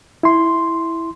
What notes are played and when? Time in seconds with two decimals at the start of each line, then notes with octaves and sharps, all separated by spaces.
0.23 E4 C6